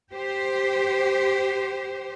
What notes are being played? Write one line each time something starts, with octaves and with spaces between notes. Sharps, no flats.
G4 C5